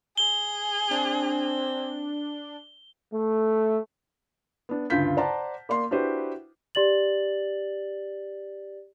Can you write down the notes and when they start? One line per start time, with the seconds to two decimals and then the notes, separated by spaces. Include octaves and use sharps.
0.18 G#4 G7
0.91 C4 D4
3.14 A3
4.69 B3 D4
4.90 D2 G2 C#3 F4 G6 B6
5.17 C5 D5 F#5 A5 A#5
5.69 A#3 D5 C6
5.91 D4 E4 F#4 G4 B4 C5
6.75 G4 D5 A6 F#7